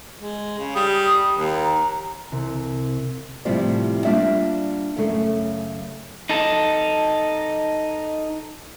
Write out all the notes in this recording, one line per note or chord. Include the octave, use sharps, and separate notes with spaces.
G#3
C#3
G3 D#6
D#2
A#5
C2
A2 C3 F3 G3 C4
G3 A#3 D4 F4 E5
F#2 C#3 A3
D#4 A4